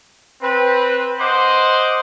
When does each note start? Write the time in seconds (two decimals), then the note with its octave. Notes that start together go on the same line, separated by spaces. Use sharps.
0.42 C4 B4
1.19 C5 D#5 F#5 C6 D6